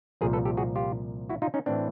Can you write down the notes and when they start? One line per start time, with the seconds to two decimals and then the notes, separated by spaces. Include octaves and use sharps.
0.21 C2 A#2 F3 G#4 A#4
0.33 A4 B4
0.45 G4 A4
0.57 F#4 G#4
0.76 F4 G4
1.29 E4 F#4
1.42 D#4 F4
1.54 C#4 D#4
1.66 A2 E3 C4 D4